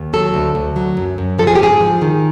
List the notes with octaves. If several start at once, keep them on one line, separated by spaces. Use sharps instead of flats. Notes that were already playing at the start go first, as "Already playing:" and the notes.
Already playing: D#2
F#3 A4
D2
D2
F#3
F#2
F#2
F3 A4
G#4
G4
G#2 G#4
F3
D#3